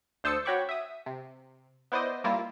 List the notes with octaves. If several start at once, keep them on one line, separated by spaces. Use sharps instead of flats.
D2 C5 A5 D#6 E6 C#7
F#4 C#5 G5 B5 C#6 D6
E5 D#6
C3
B3 E4 C5 D5 D#5
G3 A#3 E4 F4